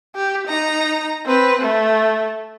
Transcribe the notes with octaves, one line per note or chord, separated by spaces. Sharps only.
G4
D#4 A#5
C4 B4
A3